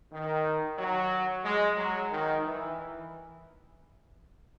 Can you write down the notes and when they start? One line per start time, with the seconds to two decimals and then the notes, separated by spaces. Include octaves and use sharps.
0.11 D#3
0.78 F#3
1.44 G#3
1.77 F#3
2.10 D#3
2.44 E3